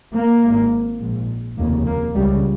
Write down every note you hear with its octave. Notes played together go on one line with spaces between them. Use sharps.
A#3
G#1 G#2
A#1 G#2
F1 D#2 C#3 A#3
A#3
C#2 C#3 G3